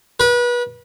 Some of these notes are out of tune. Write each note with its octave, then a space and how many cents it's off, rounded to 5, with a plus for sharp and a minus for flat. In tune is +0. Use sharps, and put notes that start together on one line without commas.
B4 -30